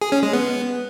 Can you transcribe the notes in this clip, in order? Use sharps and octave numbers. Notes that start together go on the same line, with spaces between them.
G#4
C#4
G#3
B3